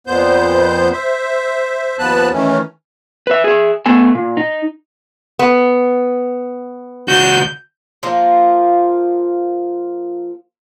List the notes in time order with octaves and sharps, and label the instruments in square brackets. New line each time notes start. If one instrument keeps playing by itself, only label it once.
[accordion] F2 A#2 B3 C5 G6
C5 E5
D#2 F3 B3 B4 A5 F#6
D#3 E3 A3 C#4
[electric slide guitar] B4 E5
G#4 E5
A3 B3 A4 G#5
A#2
D#4
[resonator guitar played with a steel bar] B3
[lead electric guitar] C#2 F#4 [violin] G6
[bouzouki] F3 A#3 F4